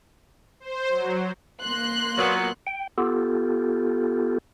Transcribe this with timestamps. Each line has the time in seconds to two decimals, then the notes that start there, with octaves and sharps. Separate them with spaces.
0.60 C5
0.89 F#3
1.61 A#3 C6 F#6
2.17 A#2 F#3 B3
2.67 G5
2.98 B3 F4 G4 A4